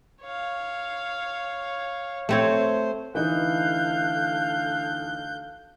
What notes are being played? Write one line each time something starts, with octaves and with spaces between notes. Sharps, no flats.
C#5 F5
A3 C4 C5 C#5
D2 E3 D#4 A4 F5 F#6 G6